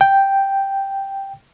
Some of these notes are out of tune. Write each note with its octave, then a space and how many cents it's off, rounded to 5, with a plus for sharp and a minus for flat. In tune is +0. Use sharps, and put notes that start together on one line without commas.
G5 +0